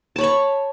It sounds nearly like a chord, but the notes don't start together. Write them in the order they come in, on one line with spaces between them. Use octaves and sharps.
A5 C#5 B5 C#6